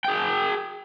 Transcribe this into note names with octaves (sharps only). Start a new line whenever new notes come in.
G#4 G5